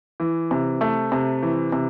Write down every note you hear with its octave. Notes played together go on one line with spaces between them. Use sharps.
E3
C3
A3
C3
E3
C3